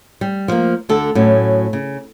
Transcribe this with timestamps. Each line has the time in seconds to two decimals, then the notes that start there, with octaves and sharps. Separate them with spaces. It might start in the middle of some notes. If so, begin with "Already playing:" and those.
0.21 G3
0.48 F3 A#3
0.89 D2 D3 A4
1.15 A2 F#3 C#4
1.73 C#3